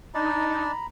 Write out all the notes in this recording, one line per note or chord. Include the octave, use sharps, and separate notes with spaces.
D4 D#4 D5 A#5 B5